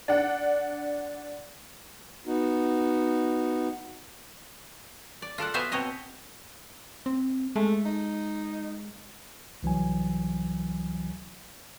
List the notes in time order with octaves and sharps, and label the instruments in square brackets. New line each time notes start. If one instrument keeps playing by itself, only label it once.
[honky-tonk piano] D4 F#5
[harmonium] B3 D#4 F#4
[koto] D5
F4 A4 D5 F#5
B3 F#4 C5 E5 F5 G#5
B2 C4 C#5 D#5 E5 A#5
[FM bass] C4
[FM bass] G#3 [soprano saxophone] A3
[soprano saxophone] D#4
[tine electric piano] C2 E3 F#3 G#5